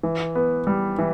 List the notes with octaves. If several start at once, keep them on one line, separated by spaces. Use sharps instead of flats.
E3
B3
G3
E3